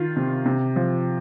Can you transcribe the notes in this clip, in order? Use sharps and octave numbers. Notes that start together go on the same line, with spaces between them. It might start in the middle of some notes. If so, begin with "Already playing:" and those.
Already playing: D#3 F4
C3
C3
F3